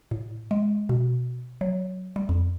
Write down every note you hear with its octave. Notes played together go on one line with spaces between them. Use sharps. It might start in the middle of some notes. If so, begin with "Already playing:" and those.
A2
G#3
B2
F#3
G3
F2